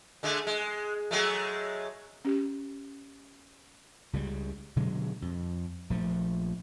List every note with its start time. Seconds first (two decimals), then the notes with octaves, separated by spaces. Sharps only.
0.23 D3 G#3 A3
0.47 G#3
1.11 F#3 G#3 A3
2.25 C#4 G4
4.13 C#2 C#3 F3 G3
4.76 B2 D3 F#3 G#3
5.22 F2
5.90 A#1 F3 A3